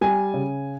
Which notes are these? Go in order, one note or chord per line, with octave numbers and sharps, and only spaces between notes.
G3 G#5
C#3